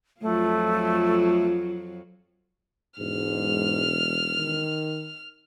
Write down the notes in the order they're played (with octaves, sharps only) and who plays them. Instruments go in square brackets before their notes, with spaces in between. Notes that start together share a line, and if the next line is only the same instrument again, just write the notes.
[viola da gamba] F2 F#3 F4 [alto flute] A3
[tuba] E1 [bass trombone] G#2 [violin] F6
[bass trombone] D#3